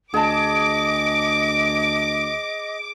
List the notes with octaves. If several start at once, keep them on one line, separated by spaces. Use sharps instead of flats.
D2 G#4 D#5 A5 D6